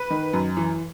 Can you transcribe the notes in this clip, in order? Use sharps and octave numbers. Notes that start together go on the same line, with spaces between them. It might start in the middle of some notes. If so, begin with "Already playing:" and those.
Already playing: B4
D#3
F#2
E3